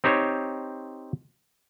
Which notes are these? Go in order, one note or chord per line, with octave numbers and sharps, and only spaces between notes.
C4 D#4 G4 C5 C#5